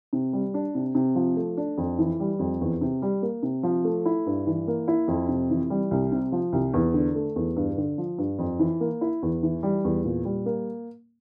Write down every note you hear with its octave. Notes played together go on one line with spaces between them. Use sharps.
C3
G3
D4
C3
C3
F3
A3
D4
F2
E3
G3
F2
E2
C3
G3
A#3
C3
F3
A3
E4
G2
E3
A#3
E4
F2
C3
E3
G3
C2
C3
F3
C2
E2
D3
A3
E2
G2
D3
F3
G2
F2
E3
A#3
E4
E2
E3
G3
E2
A#2
G3
A#3